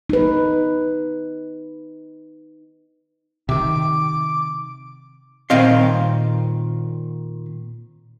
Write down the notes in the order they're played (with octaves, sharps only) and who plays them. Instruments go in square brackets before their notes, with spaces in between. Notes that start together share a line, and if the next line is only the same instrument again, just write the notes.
[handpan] D#4 B4
[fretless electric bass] C3 D#3 [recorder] D6
[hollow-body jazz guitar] A#2 D#3 C4 D#5 F5 C6